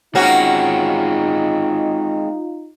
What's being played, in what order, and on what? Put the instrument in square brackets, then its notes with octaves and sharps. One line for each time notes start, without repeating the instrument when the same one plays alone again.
[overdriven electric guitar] G#3 C4 [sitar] A#3 C#4 F#4 [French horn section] D#4 F4